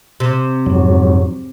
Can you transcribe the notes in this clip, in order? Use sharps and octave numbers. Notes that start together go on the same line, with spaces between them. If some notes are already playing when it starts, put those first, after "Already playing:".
C3
F2 G#2 F#3